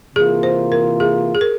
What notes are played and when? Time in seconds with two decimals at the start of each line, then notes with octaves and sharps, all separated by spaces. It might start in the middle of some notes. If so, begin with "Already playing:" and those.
0.16 C3 E3 A#3 F4 G#4
0.43 C5
0.72 A#4
1.00 G#4
1.35 G#4
1.41 A#4